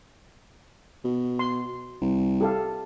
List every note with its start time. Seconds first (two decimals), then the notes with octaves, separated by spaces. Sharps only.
1.04 B2
1.39 C6
2.01 C2
2.41 G4 A4 F5